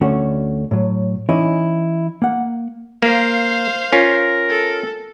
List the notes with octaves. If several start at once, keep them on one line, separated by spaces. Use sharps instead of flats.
D2 D3 A3 C#4 F#4
A2 F#3
E3 C#4 D#4 E4 D#5
A#3 F#5
A#3 C5 F5
C#4 F4 A#4
A4